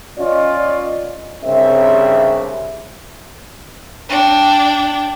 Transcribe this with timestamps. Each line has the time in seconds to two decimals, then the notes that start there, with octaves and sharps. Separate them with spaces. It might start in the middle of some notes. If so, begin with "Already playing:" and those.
0.18 C#4 F4 D5 D#5
1.44 C2 G2 C#3 C4 C#4 E5
4.09 D4 G5